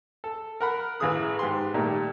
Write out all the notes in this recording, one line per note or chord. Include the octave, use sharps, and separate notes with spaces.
A4
A#4 F#5 B5
A1 E3 E4 G#4 D#6 F#6
G#2 G4 B4 C6
A#2 D#3 G3 A3